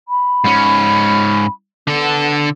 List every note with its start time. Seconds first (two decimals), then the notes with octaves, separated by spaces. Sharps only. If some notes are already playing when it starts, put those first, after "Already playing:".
0.08 B5
0.44 G#2 C#4
1.87 D3 B3 A4